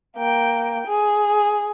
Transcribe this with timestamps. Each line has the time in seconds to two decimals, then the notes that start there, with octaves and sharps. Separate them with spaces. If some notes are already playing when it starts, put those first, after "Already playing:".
0.17 A#3 G5
0.87 G#4